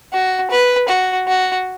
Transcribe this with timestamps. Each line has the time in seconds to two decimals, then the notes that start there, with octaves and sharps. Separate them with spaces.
0.13 F#4
0.50 B4
0.88 F#4
1.27 F#4